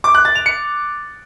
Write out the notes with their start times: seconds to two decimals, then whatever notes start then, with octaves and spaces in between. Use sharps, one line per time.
0.04 D6
0.15 F#6
0.25 A6
0.35 F7
0.46 C#7